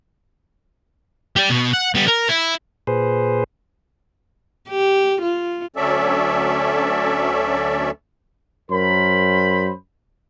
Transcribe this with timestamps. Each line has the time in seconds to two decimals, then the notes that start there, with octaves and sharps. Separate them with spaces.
1.36 G4 D5
1.50 B2
1.73 F#5
1.95 G3 B3
2.08 A#4
2.29 E4
2.87 A#2 G#4 B4 C5
4.70 G4
5.22 F4
5.76 D2 F#3 C#4 A4 D5 E5
8.71 F#2 A#4 C5 B5